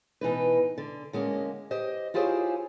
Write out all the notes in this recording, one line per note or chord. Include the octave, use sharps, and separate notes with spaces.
B2 E3 D#4 B4
D3
D3 G#3 A#3 C#4
G4 C5 D#5
E4 F4 G4 G#4 C5 C#5